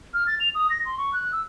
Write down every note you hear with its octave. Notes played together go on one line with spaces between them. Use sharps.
F6
A6
F7
D#6
A#6
C6
C#6
F#6
E6